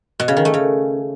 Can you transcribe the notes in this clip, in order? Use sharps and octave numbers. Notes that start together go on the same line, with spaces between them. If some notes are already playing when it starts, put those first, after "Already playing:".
B2
C#3
D#3
A3
C#3